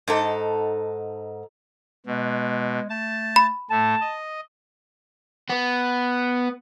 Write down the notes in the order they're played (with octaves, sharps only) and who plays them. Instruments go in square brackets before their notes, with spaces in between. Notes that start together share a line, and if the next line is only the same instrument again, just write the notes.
[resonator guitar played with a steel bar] G#2 D#4 A4
[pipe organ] B2 [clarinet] G#3
[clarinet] A3 [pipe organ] A5
[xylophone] B5
[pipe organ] A2 A3 [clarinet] A5
[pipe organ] D#5
[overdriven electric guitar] B3